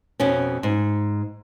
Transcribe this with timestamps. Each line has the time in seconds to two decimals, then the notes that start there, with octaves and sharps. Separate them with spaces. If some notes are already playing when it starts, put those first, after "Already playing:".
0.20 F2 B2 C#4
0.63 G#2